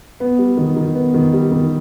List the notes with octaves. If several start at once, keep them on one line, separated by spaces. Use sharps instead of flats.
B3
G3
D#3
D#3
B3
D#3
G3
D#3